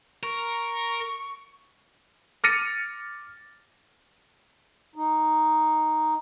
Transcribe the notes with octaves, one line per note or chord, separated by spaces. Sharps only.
A#4 C#6
D6 F6 A6 A#6 C#7 D#7
D#4